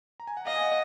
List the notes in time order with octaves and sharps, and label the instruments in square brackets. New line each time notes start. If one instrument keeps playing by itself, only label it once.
[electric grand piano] A#5
G#5
F#5
[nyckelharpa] D#5 [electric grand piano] F5
[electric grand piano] G#5
F#5